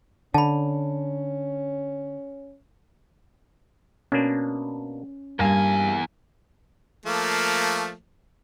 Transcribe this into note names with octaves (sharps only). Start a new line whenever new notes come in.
D3 C#4 A5 B5
B2 A#3 C#4 D4
E2 G2 A#3 F5 G#5
F3 A3 A#3